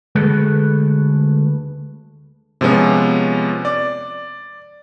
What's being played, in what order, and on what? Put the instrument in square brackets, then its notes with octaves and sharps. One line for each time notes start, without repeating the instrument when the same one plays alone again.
[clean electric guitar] D2 G#3 A3 B4
[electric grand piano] C3 F3 G#3 B3 C#4
D5